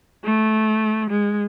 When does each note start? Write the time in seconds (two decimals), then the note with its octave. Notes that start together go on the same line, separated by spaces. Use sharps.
0.25 A3
1.10 G#3